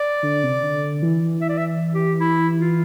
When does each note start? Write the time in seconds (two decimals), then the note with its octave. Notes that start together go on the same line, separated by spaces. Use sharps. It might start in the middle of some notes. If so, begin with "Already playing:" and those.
Already playing: D5
0.23 D3
0.43 C3
0.63 D3
1.02 E3
1.41 E5
1.49 D5
1.58 E5
1.94 G4
2.20 E4
2.60 F4